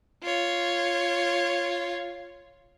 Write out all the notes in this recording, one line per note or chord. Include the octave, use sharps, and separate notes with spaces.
F4 C#5